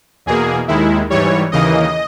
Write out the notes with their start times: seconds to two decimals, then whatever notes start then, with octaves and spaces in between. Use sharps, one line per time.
0.26 E2 B2 A#3 G#4
0.68 D#2 D#3 G#3 E4
1.10 G#2 E3 G3 C#5
1.52 D#2 C#3 E3 A#3 D#5